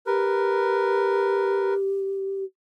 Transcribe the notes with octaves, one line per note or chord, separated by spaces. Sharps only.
G4 A#4 B4